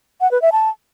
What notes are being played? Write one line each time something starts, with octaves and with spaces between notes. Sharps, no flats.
F#5
B4
E5
A5